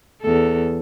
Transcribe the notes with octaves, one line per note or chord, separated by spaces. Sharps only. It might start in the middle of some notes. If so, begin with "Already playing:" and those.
E2 A4